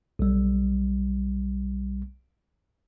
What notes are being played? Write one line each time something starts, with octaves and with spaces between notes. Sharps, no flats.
B1 G3